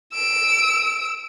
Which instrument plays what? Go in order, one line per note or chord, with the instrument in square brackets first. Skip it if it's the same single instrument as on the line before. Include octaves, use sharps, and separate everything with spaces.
[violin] E6 D7